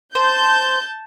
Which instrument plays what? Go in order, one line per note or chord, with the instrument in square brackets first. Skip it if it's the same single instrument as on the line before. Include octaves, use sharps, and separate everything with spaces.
[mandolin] C5 [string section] A5 G6